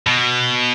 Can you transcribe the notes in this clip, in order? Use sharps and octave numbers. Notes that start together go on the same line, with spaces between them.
B2